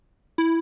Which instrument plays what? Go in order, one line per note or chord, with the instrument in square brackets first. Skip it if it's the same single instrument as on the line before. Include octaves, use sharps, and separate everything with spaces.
[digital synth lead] E4